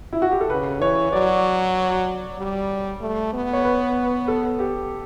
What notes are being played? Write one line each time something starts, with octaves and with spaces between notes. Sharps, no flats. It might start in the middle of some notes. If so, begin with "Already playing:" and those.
E4
F#4
G4
A4
C#3 B4
E3 C#5
F#3 D5
G3
A3
B3
C#5
B4
A4
G4